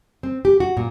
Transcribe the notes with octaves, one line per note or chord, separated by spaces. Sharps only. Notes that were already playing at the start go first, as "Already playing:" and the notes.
C4
G4
F#4
A#2